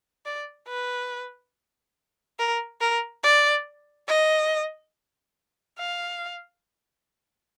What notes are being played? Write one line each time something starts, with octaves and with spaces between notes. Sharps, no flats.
D5
B4
A#4
A#4
D5
D#5
F5